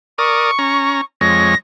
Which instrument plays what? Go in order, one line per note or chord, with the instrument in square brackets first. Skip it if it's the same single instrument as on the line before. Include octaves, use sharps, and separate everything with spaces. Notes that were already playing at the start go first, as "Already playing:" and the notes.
[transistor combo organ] A#4 D5 D#6 [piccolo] C#6
[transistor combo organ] C#4 A#5
[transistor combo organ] F2 G#3 C#5 [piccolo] A#6